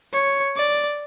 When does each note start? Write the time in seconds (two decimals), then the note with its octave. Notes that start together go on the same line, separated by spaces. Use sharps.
0.13 C#5
0.56 D5